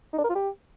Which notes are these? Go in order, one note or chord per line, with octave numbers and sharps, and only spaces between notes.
D#4
D4
A#4
F4
G4